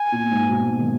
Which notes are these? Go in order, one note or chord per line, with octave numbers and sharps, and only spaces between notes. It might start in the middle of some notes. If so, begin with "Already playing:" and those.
Already playing: G#5
A#2
G#2
B2
G#2
D#3